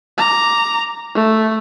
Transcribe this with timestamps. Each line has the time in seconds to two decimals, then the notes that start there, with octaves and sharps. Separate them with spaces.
0.18 A#5 D6
1.15 A3